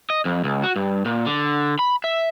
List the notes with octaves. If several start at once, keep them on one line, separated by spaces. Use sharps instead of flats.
D#5
F2
C#2
F#4
G2
A#2
D3
B5
E5